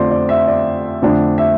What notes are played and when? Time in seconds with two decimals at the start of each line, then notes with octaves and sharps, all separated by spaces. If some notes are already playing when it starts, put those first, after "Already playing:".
Already playing: F2 D3 A3 C4 F4 C5 D5
0.11 D5
0.29 E5
0.47 D5
1.02 F2 D3 A3 D4
1.38 E5